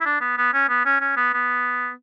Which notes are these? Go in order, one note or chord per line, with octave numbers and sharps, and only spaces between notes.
E4
D4
B3
B3
C#4
B3
C#4
C#4
B3
B3